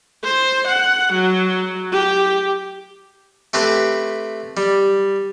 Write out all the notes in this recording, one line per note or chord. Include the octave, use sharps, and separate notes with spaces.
C5
F#5
F#3
G4
A3 C4 G4 B4
G3